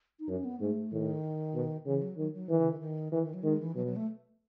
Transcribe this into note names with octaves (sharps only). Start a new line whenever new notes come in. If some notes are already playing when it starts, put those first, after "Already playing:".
D#4
F#2 C#4
B3
G#2 A3
A2 D#3
B2
C#3 E3
F#3
D#3 F#3
F#3
D#3 E3
C#3
D#3
D#3
D#3 E3
D#3
F#3
D#3 G#3
E3
B2 F#3
F#3
A3